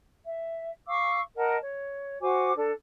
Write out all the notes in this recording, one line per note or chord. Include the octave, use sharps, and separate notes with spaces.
E5
F5 C#6 D6 E6
A#4 D#5 F#5 A5
C#5
F#4 C5 G#5 D6
D4 A4